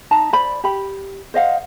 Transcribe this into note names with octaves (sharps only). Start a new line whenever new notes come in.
D#4 A5 A#5
C5 D5 B5
G4 B5
C5 D#5 F5 F#5